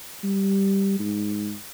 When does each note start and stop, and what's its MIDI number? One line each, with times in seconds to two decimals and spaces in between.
0.23 0.95 55
0.99 1.55 44